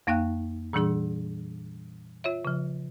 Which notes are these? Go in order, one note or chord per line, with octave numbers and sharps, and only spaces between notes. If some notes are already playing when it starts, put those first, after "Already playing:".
F2 A#3 D#4 F5 G5 F#6
A#2 E3 G3 D4 G#4 E6
F4 C#5 E5
C#3 F3